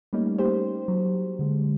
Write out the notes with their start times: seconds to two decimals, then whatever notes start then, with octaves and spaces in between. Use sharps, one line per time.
0.13 G3 A3 A#3 C#4 D#4
0.38 A#3 G4 C5
0.88 F#3
1.39 D3 G#3